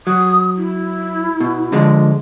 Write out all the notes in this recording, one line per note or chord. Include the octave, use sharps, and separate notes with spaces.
F#3 D#6
E4
B2
D3 F3 G#3